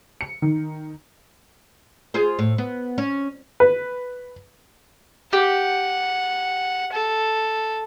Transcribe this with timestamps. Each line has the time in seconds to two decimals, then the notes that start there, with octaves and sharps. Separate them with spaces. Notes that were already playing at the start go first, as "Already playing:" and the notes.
0.21 C#7
0.42 D#3
2.14 F4 G#4 C5
2.39 A2
2.58 B3
2.98 C#4
3.60 B4
5.33 G4 F#5
6.93 A4